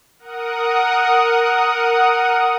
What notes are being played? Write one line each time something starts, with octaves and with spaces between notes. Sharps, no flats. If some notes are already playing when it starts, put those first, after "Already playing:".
A#4 F#5 D#6